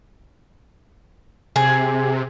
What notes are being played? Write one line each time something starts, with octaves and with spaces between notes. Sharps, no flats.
C3 G#4